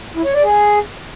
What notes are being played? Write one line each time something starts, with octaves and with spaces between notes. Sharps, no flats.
E4
C#5
D5
G#4